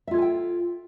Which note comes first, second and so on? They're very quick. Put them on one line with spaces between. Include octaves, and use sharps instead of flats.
E5 F4 A4 G#5 G5